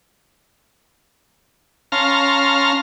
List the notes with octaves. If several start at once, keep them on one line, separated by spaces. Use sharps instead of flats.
C#4 F5 A5 A#5 C6 F6